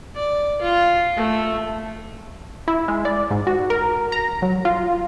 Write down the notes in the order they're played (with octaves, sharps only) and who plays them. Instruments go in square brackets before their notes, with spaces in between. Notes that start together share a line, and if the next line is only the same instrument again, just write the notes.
[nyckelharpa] D5
F4
A3
[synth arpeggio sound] E4
G#3
D5
G#2
F#4
A#4
A#5
F#3
F4